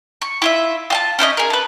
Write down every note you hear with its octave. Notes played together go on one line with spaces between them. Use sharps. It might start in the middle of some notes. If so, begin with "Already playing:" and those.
C#6
E4 F4 E5
F4 G#5 A5
C#4 E4 B4 D#5
G#4 A#4
A4 B4